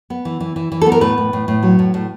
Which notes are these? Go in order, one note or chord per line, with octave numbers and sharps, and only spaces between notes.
B3
E3
E3
E3
E3
A4
B3
A#4
A2 B4
A2
A2
A2
F#3
A2
A2